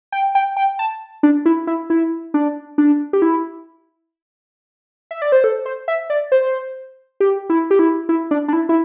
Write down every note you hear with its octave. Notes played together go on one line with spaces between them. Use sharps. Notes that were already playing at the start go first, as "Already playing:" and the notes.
G5
G5
G5
A5
D4
E4
E4
E4
D4
D4
G4
E4
E5
D5
C5
A4
C5
E5
D5
C5
G4
E4
G4
E4
E4
D4
D4
E4
E4